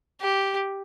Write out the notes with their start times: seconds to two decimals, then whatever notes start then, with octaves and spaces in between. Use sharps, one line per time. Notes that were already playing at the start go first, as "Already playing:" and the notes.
0.22 G4